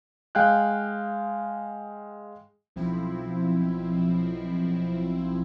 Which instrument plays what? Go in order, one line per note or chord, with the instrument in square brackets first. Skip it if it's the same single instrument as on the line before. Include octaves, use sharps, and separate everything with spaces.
[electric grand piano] G#3 F5 G5 G#5 F#6
[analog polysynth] B1 F3 C4 E4